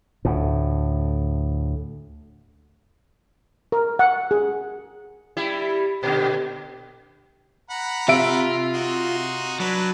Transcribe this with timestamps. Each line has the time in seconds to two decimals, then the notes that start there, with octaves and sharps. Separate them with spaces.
0.25 D2 A2
3.72 A#4
3.99 F#5
4.31 G#4
5.37 G3 E4
6.03 A#2 D3 G4
7.70 F#5 A#5 B5
8.08 C3 F4 E5 D7
8.74 D#4 F#4 C6
9.60 F#3 D4 B4